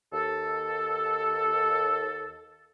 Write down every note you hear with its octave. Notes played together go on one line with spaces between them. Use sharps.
D#2 A4